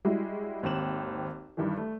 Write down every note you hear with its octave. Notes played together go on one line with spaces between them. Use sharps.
G3 G#3 E4 F#4
G#1 D#2 C4 G5 E7 F#7
G2 D#3 E3
A3